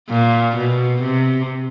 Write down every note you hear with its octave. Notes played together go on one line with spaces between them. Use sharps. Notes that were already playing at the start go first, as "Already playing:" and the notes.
A#2
B2
C3